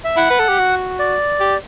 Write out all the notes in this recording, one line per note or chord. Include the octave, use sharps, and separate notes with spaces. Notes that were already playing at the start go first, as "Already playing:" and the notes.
E5
E4 F#5
B4
A4
G4
F#4
D5
G4